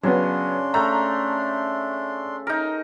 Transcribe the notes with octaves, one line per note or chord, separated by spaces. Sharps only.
C#3 F#3 B3 D4 C6
A3 A#5
D#4 A#4